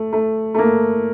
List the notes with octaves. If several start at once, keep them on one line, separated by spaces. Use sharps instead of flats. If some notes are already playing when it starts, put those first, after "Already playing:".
Already playing: A3
A3
A3
A#3